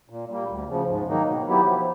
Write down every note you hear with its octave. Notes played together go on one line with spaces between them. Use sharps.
A#2
G3 A#3
D2
C#3 F3
G#2
D#3 F#3 A#3 D#4
B2
F#3 B3 E4 G4
F3